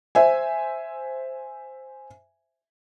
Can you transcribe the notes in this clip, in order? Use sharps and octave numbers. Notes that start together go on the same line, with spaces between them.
C5 E5 G#5